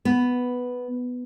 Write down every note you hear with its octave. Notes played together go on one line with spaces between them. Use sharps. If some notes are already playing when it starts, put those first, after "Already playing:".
B3